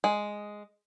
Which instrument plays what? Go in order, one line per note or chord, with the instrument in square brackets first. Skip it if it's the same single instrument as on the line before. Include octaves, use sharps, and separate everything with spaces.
[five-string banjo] G#3